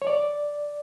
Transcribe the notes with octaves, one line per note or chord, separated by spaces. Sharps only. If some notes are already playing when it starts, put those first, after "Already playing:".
C#5
D5